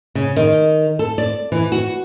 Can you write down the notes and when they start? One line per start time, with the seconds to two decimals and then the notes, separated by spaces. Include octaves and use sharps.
0.15 C#3
0.37 D#3
0.99 A4
1.18 D5
1.52 E3
1.72 F#4